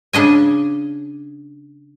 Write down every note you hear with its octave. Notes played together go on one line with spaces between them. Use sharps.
C#3 D4 D#5 G#5